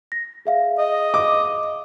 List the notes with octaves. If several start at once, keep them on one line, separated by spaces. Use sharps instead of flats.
A#6
G#4 E5 F5
D#5
D6